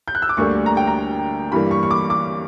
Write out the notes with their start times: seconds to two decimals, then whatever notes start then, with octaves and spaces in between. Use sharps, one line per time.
0.08 G6
0.15 F#6
0.22 E6
0.29 D6
0.37 D2 D3 G3 A#3 C#6
0.66 A#5
0.77 G5
0.87 A#5
1.52 G2 E3 G3 A#3 B5
1.71 C#6
1.83 C#6
1.91 D6
2.10 D6